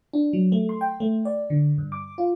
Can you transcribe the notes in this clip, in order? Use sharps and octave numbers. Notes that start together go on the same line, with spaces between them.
D4
F#3
A3
C6
G5
A3
D5
D3
G2
D6
F4